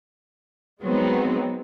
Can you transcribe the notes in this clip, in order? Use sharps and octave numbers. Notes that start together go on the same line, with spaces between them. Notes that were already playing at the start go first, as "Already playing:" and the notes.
F#3 G#3 B3 C4 D#4